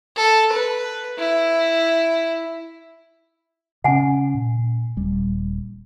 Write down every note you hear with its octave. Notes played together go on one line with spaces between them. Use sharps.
A4
B4
E4
C#3 C#4 F#5 G#5
A#2
D#1 G3